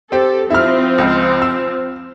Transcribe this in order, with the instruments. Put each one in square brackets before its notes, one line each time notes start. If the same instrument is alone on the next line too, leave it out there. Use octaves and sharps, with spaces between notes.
[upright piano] C4 G4 [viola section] A4
[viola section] F3 C4 [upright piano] E4 F6
[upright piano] C#2
E6